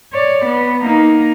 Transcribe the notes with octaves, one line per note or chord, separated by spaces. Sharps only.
C#5 D5
B3
A#3 D#4